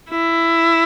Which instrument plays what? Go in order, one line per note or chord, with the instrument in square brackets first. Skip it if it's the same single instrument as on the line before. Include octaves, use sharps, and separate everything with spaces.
[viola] E4